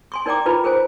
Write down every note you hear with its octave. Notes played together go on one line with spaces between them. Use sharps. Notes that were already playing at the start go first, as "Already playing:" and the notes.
G#5 C6 C#6
D#4 A#4 D5 G5 A#5 D6
D#4 F4 A#4 B4 A#5 B5
G#4 A#4 C5 G#5